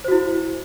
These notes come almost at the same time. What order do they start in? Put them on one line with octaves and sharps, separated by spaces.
C5 F#4 E4